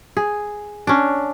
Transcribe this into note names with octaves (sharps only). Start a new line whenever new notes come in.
G#4
C#4 D4